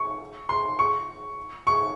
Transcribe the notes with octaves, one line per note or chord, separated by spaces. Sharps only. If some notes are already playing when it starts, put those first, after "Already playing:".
Already playing: C#6
C6
C#6
C#6